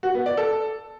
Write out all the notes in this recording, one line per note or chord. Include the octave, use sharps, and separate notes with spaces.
F#4
B3
D5
A4